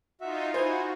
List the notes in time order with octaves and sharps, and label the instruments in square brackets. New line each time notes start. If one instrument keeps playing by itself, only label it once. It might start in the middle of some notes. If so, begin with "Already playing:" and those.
[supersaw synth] D#4 F4 [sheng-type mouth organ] F#4 E5
[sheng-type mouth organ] E4 G#5 [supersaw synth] F#4 [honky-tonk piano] C5